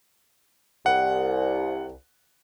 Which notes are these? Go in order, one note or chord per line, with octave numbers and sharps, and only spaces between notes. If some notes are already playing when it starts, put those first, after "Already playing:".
C2 F#5